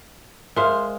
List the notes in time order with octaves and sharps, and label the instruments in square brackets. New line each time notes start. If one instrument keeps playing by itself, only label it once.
[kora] G#3 C5 F5 [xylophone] A#4 E5 C6